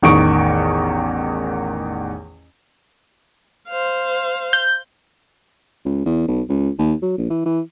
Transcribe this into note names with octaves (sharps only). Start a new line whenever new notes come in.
A1 E2 D#3 C#6 D7
C5 F5
G6
C#2
E2
B1
C#2
D#2
F#3
A#1
E3
E3